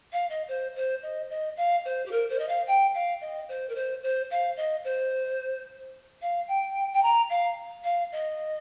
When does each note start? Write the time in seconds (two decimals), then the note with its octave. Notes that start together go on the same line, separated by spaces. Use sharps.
0.12 F5
0.29 D#5
0.48 C5
0.75 C5
1.02 D#5
1.30 D#5
1.56 F5
1.85 C5
2.05 G4
2.11 A#4
2.29 C5
2.38 D#5
2.48 F5
2.67 G5
2.94 F5
3.21 D#5
3.48 C5
3.68 A#4
3.75 C5
4.03 C5
4.30 F5
4.57 D#5
4.84 C5
6.21 F5
6.47 G5
6.93 G5
7.02 A#5
7.29 F5
7.83 F5
8.12 D#5